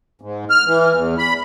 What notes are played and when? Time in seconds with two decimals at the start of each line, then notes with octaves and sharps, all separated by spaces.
0.21 G#2
0.50 F6
0.66 E3
0.95 E2
1.18 B5